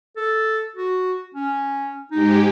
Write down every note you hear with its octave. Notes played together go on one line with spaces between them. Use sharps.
A4
F#4
C#4
G#2 G#3 D#4 G4